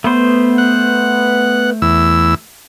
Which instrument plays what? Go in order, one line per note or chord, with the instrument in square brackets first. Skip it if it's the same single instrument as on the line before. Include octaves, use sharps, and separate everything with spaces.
[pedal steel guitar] A3 C5 [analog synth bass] B3
[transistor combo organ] F#5
E2 E6